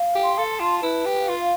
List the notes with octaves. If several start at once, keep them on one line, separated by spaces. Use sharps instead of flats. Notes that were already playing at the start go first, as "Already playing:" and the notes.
Already playing: F5
G4
C6
A4
A5
F4
E4 B4
G4
F5
F4